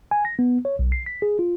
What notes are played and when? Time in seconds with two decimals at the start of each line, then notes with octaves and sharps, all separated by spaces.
0.11 G#5
0.25 A#6
0.39 B3
0.65 C#5
0.79 B1
0.92 C7
1.06 B6
1.22 G#4
1.39 F4